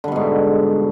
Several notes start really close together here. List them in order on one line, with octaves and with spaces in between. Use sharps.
D3 G3 B2 G#2